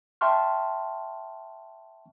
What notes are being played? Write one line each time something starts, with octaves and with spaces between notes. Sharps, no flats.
E5 G5 A5 C6 C#6 F6